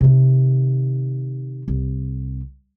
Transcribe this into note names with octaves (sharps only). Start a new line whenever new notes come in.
C3 D#3
C2